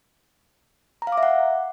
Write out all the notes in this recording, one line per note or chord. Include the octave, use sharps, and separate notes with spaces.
A#5
F5
D6
E5
F#5